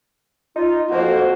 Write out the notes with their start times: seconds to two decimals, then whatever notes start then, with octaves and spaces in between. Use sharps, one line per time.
0.56 D#4 F4
0.91 F2 A#3 F#4 C5